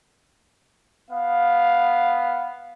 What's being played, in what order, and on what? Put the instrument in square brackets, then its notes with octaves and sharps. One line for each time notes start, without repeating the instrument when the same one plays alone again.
[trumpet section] B3 F5